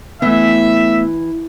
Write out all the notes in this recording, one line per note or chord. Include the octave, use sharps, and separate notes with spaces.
E3 A3 B3 E5